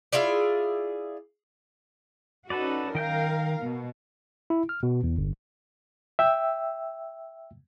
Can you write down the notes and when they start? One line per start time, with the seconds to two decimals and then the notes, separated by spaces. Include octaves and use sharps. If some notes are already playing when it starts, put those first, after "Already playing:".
0.12 E4 F4 G#4 D5
2.50 C#4 D#4 F#4 A4 B4 D5
2.95 D#3 A#4 F5 G5 G6
3.60 B2
4.50 E4
4.69 F6
4.83 B2
5.03 E2
5.17 G1
6.19 E5 G5 E6